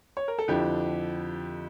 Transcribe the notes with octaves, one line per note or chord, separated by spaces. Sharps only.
C#5
A#4
A4
F2 D3 F3 E4 G4